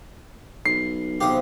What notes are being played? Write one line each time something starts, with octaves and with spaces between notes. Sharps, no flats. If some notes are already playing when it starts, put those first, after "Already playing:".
B1 C7
B1 E2 C3 G4 F5 D#6